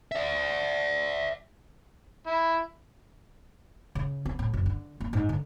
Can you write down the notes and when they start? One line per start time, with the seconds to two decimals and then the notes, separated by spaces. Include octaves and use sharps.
0.12 D5 E5
2.27 E4
3.95 C#3
4.25 B3
4.39 A2
4.54 F#1
4.66 D3
5.00 A#3
5.13 G#2
5.29 D3